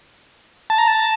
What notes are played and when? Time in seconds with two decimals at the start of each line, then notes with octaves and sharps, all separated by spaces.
0.70 A5
0.78 A#5
0.88 A5